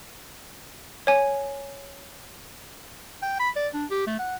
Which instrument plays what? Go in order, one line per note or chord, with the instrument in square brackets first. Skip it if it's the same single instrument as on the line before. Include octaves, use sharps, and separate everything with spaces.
[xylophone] C#5 G#5
[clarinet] G5
B5
D5
D4
G4
A3
F#5